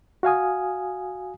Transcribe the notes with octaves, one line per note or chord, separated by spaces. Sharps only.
F#4 F5 G#5 D#6